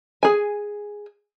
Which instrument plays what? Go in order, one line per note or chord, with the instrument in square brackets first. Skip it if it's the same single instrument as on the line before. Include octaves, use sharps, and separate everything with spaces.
[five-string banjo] G#4 G#5